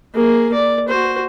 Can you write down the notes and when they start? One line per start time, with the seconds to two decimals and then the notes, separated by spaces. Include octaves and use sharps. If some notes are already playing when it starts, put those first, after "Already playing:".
0.14 A#3 G#4
0.53 D5
0.88 F#4 C5